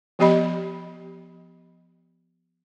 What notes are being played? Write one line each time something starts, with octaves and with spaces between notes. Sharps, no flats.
F3 B3 G4 D#5 B5